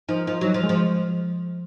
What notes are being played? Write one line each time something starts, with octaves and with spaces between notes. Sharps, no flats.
F3 D#4
F3 D#4
F#3 D#4
F3
G#3
F3